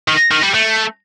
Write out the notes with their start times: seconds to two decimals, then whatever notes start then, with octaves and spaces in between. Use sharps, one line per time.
0.08 D#3
0.31 D#3
0.43 G3
0.54 A3